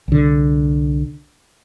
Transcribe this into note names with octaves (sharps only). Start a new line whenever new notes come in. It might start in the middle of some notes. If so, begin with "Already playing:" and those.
C2 D3